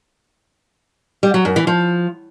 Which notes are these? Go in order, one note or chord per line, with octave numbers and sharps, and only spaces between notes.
G3
F#3
F#2
E3
F3